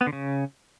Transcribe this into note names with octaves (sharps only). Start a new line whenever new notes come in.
B3
D3
C#3